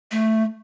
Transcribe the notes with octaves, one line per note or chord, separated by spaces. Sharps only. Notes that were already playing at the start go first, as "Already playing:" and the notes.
A3